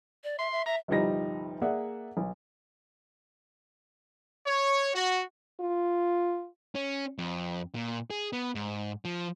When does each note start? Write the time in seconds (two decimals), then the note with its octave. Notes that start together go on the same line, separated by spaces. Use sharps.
0.24 D5
0.39 E5 C6
0.52 E5
0.66 E5 A#5
0.88 G1 C2 F3 G3 D#4 A#6
1.61 A#3 G#4 D5 E5 F#5
2.17 B1
4.47 C#5
4.93 F#4
5.60 F4
6.75 C#4
7.18 F2
7.75 A#2
8.10 G#4
8.33 B3
8.55 G#2
9.05 F3